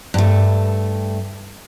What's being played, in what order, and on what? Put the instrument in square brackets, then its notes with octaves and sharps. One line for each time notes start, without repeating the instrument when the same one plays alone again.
[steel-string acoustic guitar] G2 A3